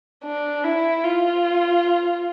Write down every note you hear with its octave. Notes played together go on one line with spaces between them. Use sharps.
D4
E4
F4